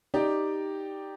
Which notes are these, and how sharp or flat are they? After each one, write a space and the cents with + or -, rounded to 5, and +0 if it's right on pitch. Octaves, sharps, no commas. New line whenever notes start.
D#4 +0 G4 +0 D5 +0